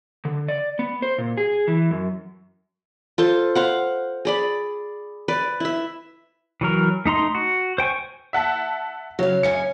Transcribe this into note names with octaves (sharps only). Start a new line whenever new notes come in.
D3
D5
B3
C5
A#2
G#4
E3
F#2
F4 A4 C5
C5 F5 F#5
G#4 D5 B5
B4 D5
E4 E5
E3 F#3 A#4
A3 D#4 A#5 C6
F#4
C5 G5 G#5 C#6
E5 F#5 A5
C#3 F#3 F5
F#2 C#3 G#5 C#7